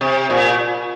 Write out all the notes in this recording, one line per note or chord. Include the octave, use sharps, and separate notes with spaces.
C3
A#2